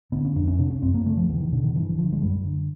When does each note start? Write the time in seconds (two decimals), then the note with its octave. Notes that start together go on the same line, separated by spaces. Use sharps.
0.12 D3 B3
0.25 C#4
0.36 F2 D4
0.48 C#4
0.59 C3 D4
0.71 C#4
0.82 F#2 C4
0.94 A#3
1.06 C#3 A3
1.17 F3
1.29 E2 E3
1.40 D#3
1.52 B2 D3
1.64 D#3
1.75 G2 E3
1.89 E3
1.98 D3 F3
2.12 G#3
2.22 F#2 G3
2.45 D3